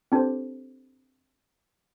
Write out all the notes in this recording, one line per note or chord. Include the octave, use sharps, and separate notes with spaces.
C4 D4 G4 A4 C5